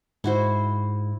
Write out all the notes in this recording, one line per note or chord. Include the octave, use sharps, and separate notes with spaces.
G#2 E4 F#4 C5